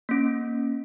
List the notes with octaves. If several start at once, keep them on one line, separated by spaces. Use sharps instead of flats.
A#3 C#4